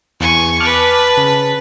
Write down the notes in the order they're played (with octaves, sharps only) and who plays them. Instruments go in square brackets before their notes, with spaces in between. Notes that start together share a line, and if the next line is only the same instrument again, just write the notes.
[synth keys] E2 [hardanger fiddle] G#5 C#6
[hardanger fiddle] B4 A5 [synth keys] D6 F6 F#6
[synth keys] C#3